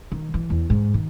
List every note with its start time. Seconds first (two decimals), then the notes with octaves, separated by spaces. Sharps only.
0.12 D#3
0.34 E3
0.50 E2
0.70 G#2
0.94 D#3